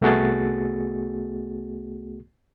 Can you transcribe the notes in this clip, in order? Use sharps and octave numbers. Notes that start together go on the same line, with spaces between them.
C2 A3 B3 F#4 G#4 A6